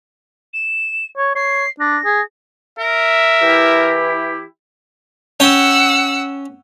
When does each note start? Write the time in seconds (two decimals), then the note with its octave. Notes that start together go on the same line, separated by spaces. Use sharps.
0.53 E7
1.18 C#5
1.35 C#5 C7
1.80 D4 A#6
2.05 G#4
2.79 A#4 E5
3.42 E3 E4 G4
5.40 C#4 F#5 G5 E6